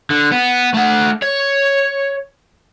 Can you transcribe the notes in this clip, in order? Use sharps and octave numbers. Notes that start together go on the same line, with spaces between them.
D3
B3
A3 F#5
C#5